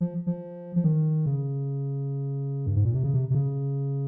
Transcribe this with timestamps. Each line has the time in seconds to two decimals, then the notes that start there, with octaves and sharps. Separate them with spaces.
0.01 F3
0.27 F3
0.76 F3
0.84 D#3
1.26 C#3
2.66 G2
2.76 G#2
2.85 A#2
2.94 C3
3.04 C#3
3.14 C3
3.30 C3
3.35 C#3